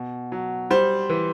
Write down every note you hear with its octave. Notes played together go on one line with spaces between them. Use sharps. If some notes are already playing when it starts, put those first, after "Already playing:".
Already playing: B2
F#3
G3 C5
E3